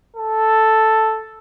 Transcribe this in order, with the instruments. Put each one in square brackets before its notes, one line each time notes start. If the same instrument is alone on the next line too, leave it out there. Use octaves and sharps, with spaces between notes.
[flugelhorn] A4